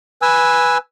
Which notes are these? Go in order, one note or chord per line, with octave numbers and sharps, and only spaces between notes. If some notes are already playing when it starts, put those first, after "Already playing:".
B4 G#5 E6